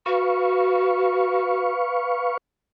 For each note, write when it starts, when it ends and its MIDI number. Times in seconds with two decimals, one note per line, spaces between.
0.06 1.70 66
0.06 2.37 71
0.06 2.37 77
0.06 2.37 85